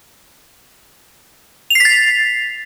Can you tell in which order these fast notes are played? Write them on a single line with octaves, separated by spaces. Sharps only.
F7 C7 B6 A6